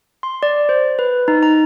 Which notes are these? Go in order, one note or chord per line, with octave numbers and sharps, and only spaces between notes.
C6
D5
C5
B4
D#4
A#5